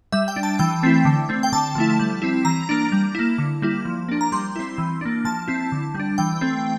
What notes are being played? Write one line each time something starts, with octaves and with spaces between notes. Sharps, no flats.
G3 E5
G5
D4
A5
E3 G5
A3 C4 E4
D3
A3 C4
G5
D3 A5
F3 A3 E4
G3
C4 E4
E3 A#5
A#3 D4
G3
A#3 E4
D3
G3 A#3 E4
F3
A#3 D4
A#5
G3 C6
C4 E4
E3
A#3 D4
F3 A5
C4 E4
D3
G3
D4
E3 G5
A3 C4